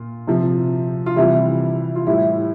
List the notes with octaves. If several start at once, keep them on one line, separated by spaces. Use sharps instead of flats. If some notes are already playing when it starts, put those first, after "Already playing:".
Already playing: A#2 F4
C3 F3
F4
C3 E3 G3 E4
F4
A2 G3 E4